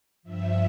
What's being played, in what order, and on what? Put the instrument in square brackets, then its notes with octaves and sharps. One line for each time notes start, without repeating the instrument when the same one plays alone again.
[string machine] G2 F3 E5